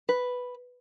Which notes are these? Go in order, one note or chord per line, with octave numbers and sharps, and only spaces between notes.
B4